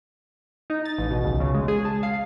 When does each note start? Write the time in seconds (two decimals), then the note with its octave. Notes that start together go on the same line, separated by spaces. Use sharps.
0.70 D#4
0.85 A6
0.98 A1
1.11 B2
1.24 C#2
1.40 C#3
1.54 G#3
1.68 G#4
1.85 A5
2.03 F5